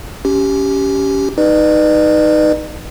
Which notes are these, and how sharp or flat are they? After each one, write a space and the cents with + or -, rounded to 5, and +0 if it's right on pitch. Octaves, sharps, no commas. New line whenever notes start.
C#4 +20 G4 -10
D#4 +0 B4 -10 D5 +45